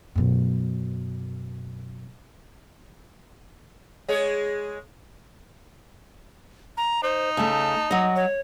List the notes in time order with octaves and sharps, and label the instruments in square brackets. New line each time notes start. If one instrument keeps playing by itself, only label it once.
[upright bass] F#2 B2
[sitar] G#3 G#4 C#5
[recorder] A#5
[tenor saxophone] D#4 [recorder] C5
[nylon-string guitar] C#3 A3 [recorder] A5
[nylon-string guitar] F#3 D#5
[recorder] C#5